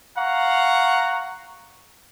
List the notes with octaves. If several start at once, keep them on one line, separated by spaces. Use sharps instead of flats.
F5 F#5 A#5 C#6